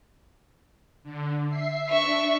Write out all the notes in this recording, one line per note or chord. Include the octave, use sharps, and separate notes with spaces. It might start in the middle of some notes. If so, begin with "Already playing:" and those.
D3
E5 C7
D4 E5 C#6